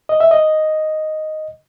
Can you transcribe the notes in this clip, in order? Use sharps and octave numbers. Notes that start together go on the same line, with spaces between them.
D#5
E5
D#5